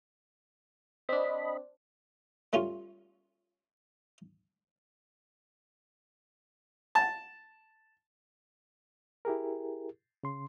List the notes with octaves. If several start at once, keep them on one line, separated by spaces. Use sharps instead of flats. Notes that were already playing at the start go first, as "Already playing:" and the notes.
C4 D4 D#5 B5
G3 A3 C#4 F4
A5
E4 G4 G#4 A#4
C#3 C6